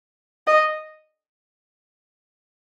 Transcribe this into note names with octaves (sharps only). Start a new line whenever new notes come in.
D#5